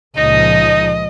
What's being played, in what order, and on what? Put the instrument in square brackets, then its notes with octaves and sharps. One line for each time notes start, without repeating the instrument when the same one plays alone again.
[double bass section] C#2 A#2 F3 [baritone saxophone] D#4 [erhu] D#5